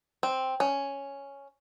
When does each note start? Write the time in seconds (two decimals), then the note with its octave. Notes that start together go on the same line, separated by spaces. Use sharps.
0.23 C4
0.60 C#4